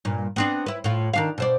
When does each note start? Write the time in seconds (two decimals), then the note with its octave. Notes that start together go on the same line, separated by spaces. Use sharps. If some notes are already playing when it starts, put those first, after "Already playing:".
0.05 G2 A#2
0.36 B3 C4 D4
0.66 E4 B4
0.84 A2 F4
1.14 D#3 D4 F5
1.38 B2 C5 D5